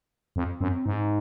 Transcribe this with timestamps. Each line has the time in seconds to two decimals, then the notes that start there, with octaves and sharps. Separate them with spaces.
0.36 F2
0.61 F#2 C4
0.86 G#2 D#4